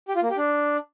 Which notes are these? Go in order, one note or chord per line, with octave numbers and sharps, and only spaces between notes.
G4
F4
A#3
G4
D4